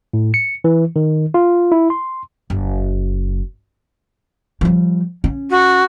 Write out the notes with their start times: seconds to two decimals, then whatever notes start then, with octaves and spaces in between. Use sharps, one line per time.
0.14 A2
0.34 C#7
0.64 E3
0.96 D#3
1.34 F4
1.72 E4
1.90 C6
2.50 F#1
4.61 F3 G3
5.24 C#4
5.51 F#4